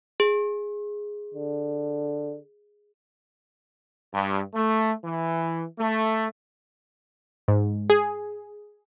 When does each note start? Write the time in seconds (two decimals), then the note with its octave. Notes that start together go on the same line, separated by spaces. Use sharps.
0.20 G#4
1.34 D3
4.14 G2
4.54 A3
5.04 E3
5.79 A3
7.48 G#2
7.90 G#4